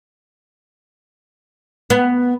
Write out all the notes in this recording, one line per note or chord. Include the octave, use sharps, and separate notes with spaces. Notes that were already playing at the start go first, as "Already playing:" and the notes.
B3